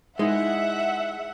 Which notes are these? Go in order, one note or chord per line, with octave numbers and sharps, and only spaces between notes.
G#3 D#4 E4 E5 F#5